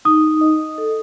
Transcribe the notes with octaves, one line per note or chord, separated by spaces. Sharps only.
D#4 D#6
D#5
A4